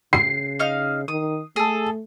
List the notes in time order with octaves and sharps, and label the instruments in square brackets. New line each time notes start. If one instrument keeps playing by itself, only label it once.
[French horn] C#3 [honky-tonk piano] C7
[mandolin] D#4 F5 F6
[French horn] D#3 [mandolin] D#6
[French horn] A3 [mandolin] G#4 A4